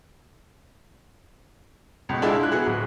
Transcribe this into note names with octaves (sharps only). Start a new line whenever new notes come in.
C#2 B2
G#3 D4 E4 F4 G#4
E4 F#6
B3 F#4 G#4
D1